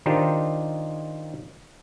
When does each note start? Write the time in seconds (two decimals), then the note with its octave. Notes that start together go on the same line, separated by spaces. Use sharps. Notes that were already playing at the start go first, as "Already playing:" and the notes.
0.06 D#3 D4 D#4 F4 G4 C5